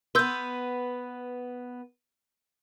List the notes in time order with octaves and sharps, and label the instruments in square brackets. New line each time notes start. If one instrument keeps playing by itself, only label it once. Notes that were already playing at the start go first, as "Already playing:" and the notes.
[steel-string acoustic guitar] B3 B4 [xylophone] C6 E6 G6